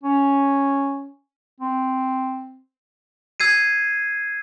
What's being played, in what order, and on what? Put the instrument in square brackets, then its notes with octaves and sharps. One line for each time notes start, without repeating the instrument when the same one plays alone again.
[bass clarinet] C#4
C4
[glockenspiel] E6 G#6 C7 D#7